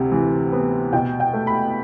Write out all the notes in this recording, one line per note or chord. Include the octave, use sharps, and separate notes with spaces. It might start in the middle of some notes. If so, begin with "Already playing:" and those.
Already playing: D2 C3
E3
B3
B2 G5
G5
A3
B5